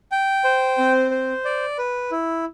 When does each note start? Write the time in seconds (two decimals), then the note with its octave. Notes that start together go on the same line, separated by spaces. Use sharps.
0.12 G5
0.44 C5
0.78 C4
1.11 C5
1.45 D5
1.78 B4
2.11 E4